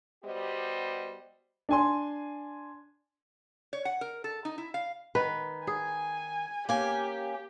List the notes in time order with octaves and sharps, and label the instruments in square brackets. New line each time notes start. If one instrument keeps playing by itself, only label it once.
[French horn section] G3 B3 F#4 G4 C5 D#5
[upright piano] D4 G#5 C6
[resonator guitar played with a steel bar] C#5
F#5
A#4
A4
D#4
E4
F5
[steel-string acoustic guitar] D#3 [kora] B4
[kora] G#4 [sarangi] G#5
[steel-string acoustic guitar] A#3 C#4 G#5 [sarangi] G4